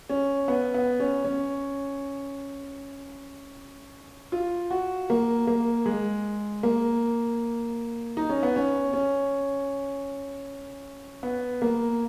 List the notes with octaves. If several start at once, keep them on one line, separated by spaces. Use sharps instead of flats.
C#4
B3
B3
C#4
C#4
F4
F#4
A#3
A#3
G#3
A#3
D#4
C#4
B3
C#4
C#4
B3
A#3